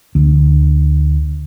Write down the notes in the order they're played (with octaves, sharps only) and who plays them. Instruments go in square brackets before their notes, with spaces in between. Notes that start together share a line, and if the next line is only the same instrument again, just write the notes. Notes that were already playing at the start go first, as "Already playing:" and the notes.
[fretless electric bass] D2